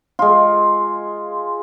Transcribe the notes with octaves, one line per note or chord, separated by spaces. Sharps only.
G#3 F4